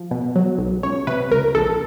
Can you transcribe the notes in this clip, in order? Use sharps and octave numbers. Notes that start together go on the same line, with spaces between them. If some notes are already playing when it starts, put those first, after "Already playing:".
Already playing: F3
B2
F#3
B1
C#2 C#5
C3 B4
C#2 A#4
A#1 A4